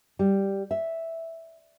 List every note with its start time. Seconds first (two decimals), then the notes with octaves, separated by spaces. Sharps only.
0.19 G3
0.71 E5